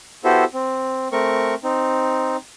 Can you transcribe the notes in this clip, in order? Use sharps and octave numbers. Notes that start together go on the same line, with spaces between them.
B3 E4 F#4 G4 A4 C5
C4
A3 C4 A#4 C#6
C4 D#4